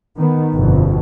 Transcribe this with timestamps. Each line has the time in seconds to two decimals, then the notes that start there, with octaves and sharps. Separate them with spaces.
0.17 D#3 B3
0.55 G1 F2 B2